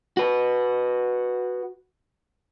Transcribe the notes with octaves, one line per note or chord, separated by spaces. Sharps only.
F#4 B4